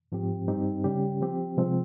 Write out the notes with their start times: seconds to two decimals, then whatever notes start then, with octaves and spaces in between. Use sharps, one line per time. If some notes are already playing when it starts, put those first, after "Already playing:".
0.12 G#2 F3 C4 G4
0.48 G2 G3 C4 D#4 G4
0.84 C#3 G3 C#4 G4
1.21 F3 C4 G4
1.57 C3 F3 G#3 C4